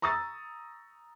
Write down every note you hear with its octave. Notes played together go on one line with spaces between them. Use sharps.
A#5 C#6 D#6 E6 A6